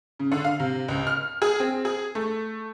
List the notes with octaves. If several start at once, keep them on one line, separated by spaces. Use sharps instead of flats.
C#3
D3
F5
C3
C#2
F6
G#4
C4
G#4
A3